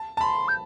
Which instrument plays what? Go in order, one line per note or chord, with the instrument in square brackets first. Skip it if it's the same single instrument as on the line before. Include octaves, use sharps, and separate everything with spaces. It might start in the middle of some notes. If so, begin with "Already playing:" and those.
Already playing: [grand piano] A5
A5
[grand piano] B5 [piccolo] C6
[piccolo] G6